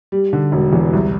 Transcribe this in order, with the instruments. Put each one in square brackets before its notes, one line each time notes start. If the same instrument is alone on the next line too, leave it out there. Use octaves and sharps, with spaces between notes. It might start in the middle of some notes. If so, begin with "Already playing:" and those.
[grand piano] G3
D3
E1
E2
C2